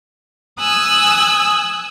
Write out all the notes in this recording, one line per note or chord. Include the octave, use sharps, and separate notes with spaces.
G#5 D#6 E6 F#6